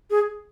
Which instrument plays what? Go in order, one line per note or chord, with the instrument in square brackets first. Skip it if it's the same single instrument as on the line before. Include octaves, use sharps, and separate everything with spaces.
[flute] G#4